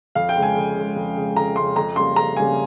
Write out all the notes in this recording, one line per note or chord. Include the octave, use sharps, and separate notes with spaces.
F2 F5
G5
C#3 G#3
G#5
F2
C#3 G#3
F2
C#3 G#3
F2 A#5
C#3 G#3 C6
F2 A#5
C#3 G3 A#3 C6
F2 A#5
C#3 G3 A#3 G#5